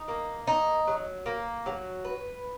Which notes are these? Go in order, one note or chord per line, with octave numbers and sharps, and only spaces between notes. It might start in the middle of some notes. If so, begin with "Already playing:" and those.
Already playing: D#4
A#3
D#4
F#3
A#3
F#3
B4